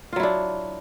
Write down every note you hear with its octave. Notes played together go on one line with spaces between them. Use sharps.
F#3 D4 E4 F4